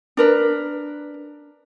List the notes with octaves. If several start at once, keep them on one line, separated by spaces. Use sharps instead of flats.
D4 A#4 B4